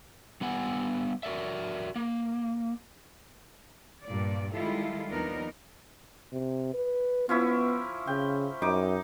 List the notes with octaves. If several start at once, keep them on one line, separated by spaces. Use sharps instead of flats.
G3 B3 F#5 G#5
F#4 A#4 D5 E5
A#3
G2 A#2 D5
D#3 G3 G#3 E4 F4 A4
D#2 F3 B3 D4 D#4 A#4
C3
B4
F3 B3 C#4 E4
C#3 G5
F#2 D#4 D6